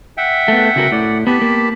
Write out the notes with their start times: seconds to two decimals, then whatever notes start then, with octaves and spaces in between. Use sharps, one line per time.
0.17 E5 F#5 G5
0.48 A3 B3
0.76 C#3 F#4 A#4
0.92 A2 D5 F#5
1.27 B3 G4 A5 B5
1.42 A#3